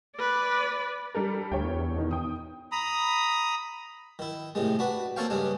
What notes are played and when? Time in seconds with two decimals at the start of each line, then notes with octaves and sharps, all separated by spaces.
0.16 B4 D5
1.15 G3 A4 A#4
1.52 D2 C#5 G5
1.64 E2
1.96 B2 D#3
2.11 G5 D#6
2.72 A#5 B5 D#6
4.19 D#3 E4
4.55 A2 C3 D#3 G#3
4.79 D4 F#4 B4
5.16 A#3 C4 A4 C#5 F5 G5
5.30 G2 C#3 G#3 D4